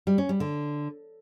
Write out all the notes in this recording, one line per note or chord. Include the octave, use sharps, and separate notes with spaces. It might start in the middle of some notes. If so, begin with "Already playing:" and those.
G3
C#4
G3
D3